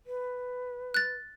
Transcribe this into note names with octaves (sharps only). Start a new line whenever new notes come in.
B4
F#6 A6